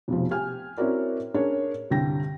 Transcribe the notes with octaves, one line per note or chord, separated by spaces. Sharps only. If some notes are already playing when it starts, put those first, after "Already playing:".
F1 B1 F3
G4 G#5 F6
C4 C#4 E4 F#4 A#4 D5
C#4 D4 G#4 A#4 C#5
C2 G2 D3 G4 G5 A#6